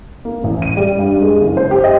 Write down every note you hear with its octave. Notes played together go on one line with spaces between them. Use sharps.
A#3
A1
D#7
G3
G2
G#3
F#1
C5
G4
D#5